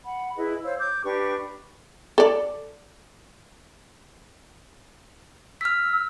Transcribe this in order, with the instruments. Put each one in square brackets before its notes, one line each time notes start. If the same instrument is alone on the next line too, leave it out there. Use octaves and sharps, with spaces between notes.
[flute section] F#5 B5
E4 G#4 B4 D#5
C5 C#5 F5 E6
D6 G6
D4 G4 B4 C#6
[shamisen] A4 D5
[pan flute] E6 [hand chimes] F6 B6